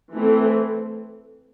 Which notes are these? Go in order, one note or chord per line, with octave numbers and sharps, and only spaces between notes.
E3 A3 C4